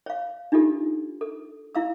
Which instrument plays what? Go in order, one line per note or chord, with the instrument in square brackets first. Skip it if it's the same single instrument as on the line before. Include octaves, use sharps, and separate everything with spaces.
[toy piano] C#5 F5
D4 D#4 F4 G4 A4
A4
E4 F5 E6